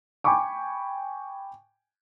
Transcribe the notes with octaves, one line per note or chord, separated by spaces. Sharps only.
G5 G#5 B5 C#6 D6